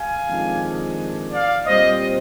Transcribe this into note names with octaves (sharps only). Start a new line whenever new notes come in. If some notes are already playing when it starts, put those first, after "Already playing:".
Already playing: F5 G#5
F2 D#3 G#3 D4
D5 F5
A#2 G3 C4 C5 D#5